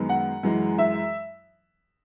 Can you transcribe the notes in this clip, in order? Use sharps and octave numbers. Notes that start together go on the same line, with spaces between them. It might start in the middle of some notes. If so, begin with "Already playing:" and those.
Already playing: F#2 D#3 G#3 B3
F#5
F#2 E3 G#3
E5